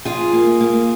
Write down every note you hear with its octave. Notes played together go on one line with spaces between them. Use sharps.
F2 F4 G#4
A#3
A#3